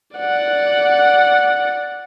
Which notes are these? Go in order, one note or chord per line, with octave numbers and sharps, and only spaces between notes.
D5 F#5